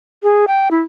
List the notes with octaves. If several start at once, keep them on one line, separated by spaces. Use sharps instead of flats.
G#4
G5
E4